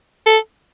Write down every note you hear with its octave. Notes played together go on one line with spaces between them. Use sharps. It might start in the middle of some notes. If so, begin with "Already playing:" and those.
A4